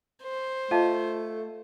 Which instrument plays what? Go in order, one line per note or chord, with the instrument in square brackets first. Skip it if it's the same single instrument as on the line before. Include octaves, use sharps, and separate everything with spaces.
[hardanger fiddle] C5
[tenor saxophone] A3 [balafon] F4 [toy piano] D#5 F5 A5